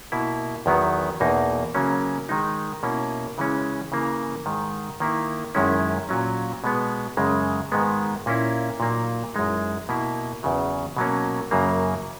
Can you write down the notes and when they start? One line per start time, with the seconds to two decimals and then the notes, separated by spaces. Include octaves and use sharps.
0.12 B2 A#3 E4
0.66 E2 D#3 F#3 B3
1.20 E2 B2 A#3 D#4
1.75 C#3 F#3 A#3 C#4
2.29 D#3 G#3 D#4
2.83 B2 A#3 C#4 E4
3.38 C#3 E3 G#3 C#4
3.92 C#3 E3 A#3
4.46 G#2 D#3 G#3
5.00 D#3 A#3 E4
5.55 F#2 D#3 G#3 C#4 E4
6.09 A#2 F#3 C#4
6.64 B2 G#3 B3
7.17 F#2 C#3 G#3
7.72 G#2 D#3 G#3 B3
8.26 A#2 A#3 C#4 E4
8.80 A#2 F#3 A#3 D#4
9.34 F#2 E3 G#3 D#4
9.89 B2 A#3 E4
10.43 E2 C#3 F#3
10.97 B2 F#3 A#3 C#4
11.51 F#2 C#3 F#3 A#3